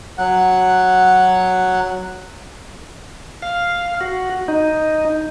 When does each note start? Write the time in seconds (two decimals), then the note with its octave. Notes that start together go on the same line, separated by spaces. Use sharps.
0.18 F#3 F#5
3.42 F5
4.01 F#4
4.48 D#4